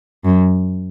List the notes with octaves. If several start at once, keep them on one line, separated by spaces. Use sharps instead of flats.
F#2